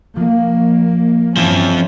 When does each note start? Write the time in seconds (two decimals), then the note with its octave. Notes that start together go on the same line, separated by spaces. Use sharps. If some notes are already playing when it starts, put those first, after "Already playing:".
0.16 F3 A#3
1.37 G2 E3 F3 C4 C#4